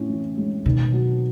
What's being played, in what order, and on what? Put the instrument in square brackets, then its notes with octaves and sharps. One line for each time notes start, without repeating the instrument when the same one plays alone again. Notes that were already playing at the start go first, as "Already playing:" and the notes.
Already playing: [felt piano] A2 C#4
E3
G#3
[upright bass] B2 [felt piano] D#3
[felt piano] F#3